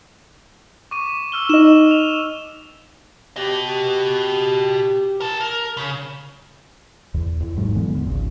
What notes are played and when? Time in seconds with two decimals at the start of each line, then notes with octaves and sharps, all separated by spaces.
0.91 C#6 D6 D#7
1.32 E6 F6 G7
1.49 D#4 D#5 E7
1.91 F7
3.36 F#4 G4 D#5
5.20 A#4 A5
5.41 A#4
5.77 C#3
7.14 E2
7.40 E2
7.57 A1 G#2 F#3
7.75 D3 E3 G#3 B3
7.95 E2
8.07 G#1 C#2 C#3